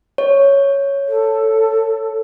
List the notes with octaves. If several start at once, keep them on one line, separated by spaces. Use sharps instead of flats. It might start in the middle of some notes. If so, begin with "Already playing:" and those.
C#5
A4